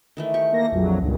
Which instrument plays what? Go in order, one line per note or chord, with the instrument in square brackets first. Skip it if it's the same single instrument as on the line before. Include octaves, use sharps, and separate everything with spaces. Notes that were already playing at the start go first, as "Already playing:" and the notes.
[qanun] D#3 E3 A3
G4 C#6
[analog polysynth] A#3 A#6
A#1 F2 F#3
C#2 G2 A#2